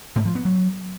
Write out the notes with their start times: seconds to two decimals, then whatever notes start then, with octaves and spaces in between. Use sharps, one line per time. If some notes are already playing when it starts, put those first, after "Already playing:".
0.16 G#2
0.25 F3
0.35 B3
0.45 F#3